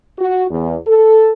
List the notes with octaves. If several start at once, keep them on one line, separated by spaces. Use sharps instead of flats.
F#4
E2
A4